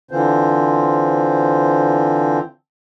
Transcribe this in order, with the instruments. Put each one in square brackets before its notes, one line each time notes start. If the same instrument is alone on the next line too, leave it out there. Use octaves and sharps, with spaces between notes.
[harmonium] D3 E3 C4 F4 C5